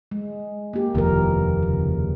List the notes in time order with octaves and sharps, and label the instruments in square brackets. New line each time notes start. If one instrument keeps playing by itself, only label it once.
[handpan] G#3
A#3 G4
[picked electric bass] F1 D#2 [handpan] E3 F3 A#4
[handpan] C#3